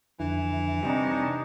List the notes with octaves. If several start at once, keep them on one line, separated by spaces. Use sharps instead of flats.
F2 D3 E3 E4
C3 G3 D4 D#4 A#5 C#6